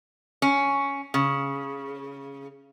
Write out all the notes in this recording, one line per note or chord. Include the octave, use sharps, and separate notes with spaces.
C#4
C#3